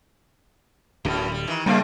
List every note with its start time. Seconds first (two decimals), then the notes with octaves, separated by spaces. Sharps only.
1.05 D1 F#2 B2 D3 G3
1.32 G3
1.48 D#3 E3
1.66 C#3 G3 G#3 A#3 C4 D4 F5